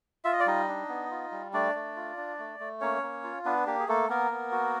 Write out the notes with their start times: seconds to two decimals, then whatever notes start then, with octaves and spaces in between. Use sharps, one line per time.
0.25 F4 E5
0.33 D#5
0.40 D5
0.46 G3 D#4 D#5
0.68 D4
0.89 B3
1.11 F4
1.32 G3
1.53 A3 D4 D5
1.75 A3
1.96 F4
2.17 D4
2.39 A3
2.60 A3
2.81 A#3 C#4 C#5
3.03 A#3
3.24 F4
3.45 B3 D4 B4
3.67 A#3 G4
3.79 G#4
3.88 A3 A#3 A4
4.10 A#3 B3 A#4
4.31 B3
4.52 F#4